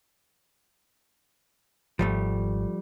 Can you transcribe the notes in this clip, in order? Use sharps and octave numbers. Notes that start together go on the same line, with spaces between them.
G#1 F3 G3 A3